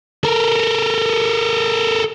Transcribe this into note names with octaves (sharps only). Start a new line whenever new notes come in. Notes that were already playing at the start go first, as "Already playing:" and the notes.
A4 A#4